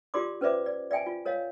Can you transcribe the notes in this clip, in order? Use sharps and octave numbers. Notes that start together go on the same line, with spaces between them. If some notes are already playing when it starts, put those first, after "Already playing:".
F4 G4 A#4 D5 C6 D6
C#4 B4 C5 D5 E5 D6
D5
D5 E5 G5 G#5
F4
A#4 C#5 D#5 F5